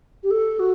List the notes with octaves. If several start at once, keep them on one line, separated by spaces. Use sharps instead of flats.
G4
A4
F#4